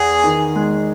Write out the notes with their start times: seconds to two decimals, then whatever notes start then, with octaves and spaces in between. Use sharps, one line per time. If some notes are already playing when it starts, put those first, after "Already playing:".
Already playing: E2 G#4
0.24 D#3
0.55 G#3